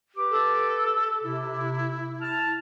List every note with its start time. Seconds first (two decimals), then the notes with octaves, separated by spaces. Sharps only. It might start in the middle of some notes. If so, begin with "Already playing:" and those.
0.17 G4 B4 D6
0.31 A4
1.24 C3 E4
2.22 A5 F6